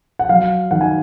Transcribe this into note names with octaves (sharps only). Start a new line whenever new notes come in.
F#5
F#3 F5
D#3 F#5
G#5